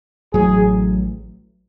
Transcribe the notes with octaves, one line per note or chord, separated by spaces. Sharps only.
A1 A2 F#3 G#4